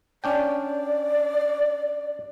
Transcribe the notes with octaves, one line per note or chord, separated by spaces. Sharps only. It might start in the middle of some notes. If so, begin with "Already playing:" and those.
C#4 D4 D5 G5